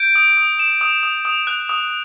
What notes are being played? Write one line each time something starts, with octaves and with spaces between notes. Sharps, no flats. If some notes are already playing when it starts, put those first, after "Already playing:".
Already playing: G6 D7
D#6
D#6
D#6 E7
D#6
D#6
D#6
F#6
D#6